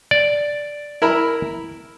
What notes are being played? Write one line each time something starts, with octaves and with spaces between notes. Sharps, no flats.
D5
E4 A#4 B5